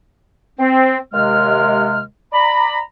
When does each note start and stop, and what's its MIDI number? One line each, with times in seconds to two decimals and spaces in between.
0.58 0.97 60
1.13 2.03 39
1.13 2.03 48
1.13 2.03 56
1.13 2.03 89
2.33 2.79 74
2.33 2.79 82
2.33 2.79 83